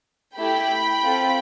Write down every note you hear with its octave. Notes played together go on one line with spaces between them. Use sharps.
A3 E4 G4 G5 B5
C4 F4 A4